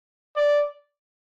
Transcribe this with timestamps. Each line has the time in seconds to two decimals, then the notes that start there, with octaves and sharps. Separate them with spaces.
0.36 D5